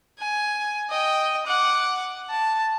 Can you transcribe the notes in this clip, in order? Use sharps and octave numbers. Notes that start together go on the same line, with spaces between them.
G#5
D#5 G5
F#5 D6
A5